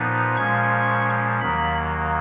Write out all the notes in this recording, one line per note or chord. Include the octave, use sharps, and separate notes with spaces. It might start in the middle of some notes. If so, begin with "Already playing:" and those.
Already playing: A#2 F3 B3 D#4
A#2 F3 G#3 C#4 C#6
D#2 D#3 F#3 A#3 B5